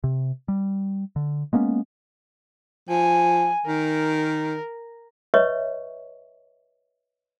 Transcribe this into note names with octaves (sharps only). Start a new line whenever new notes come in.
C3
G3
D3
G#3 A#3 B3 C#4
F3 G#5
D#3 A#4
B4 C#5 D#5 E5 C#6